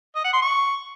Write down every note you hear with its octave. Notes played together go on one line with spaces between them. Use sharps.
D#5
F#5
C6
C#6